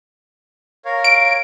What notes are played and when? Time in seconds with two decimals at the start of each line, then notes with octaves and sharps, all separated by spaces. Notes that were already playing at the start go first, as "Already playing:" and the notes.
0.85 A#4 C#5 F5
1.04 D7